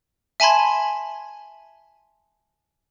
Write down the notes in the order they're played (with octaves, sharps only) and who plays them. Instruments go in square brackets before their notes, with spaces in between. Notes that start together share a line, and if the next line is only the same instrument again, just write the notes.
[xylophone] E5 G#5 A5 B5 C6 G#6